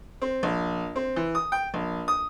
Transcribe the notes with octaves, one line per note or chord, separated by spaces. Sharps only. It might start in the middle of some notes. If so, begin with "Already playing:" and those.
C4
A#1
C4
E3
D#6
G5
A#1
D#6